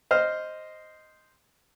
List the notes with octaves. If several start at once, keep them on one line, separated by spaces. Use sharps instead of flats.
C5 D#5 F6